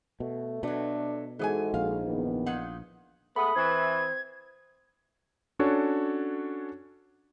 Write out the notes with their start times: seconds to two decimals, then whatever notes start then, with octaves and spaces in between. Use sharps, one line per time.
0.20 B2 A3
0.63 B2 F#3 A3 D4
1.39 G#2 E3 G#3 F#4 A4 D#5 G#5
1.74 A#1 F5
2.05 E2 D#3 B3
2.46 A#2 D#4 F#5
3.36 G#3 A3 B3 B5 D#6
3.56 E3 C4 G#6
5.59 C#4 D4 F#4 A4 C#5